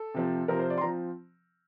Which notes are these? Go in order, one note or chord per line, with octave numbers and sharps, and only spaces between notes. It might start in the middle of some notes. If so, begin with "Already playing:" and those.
Already playing: A4
C3 F3 C4
C3 F3 C4 A#4
C5
D5
C6
F3 C4 A#5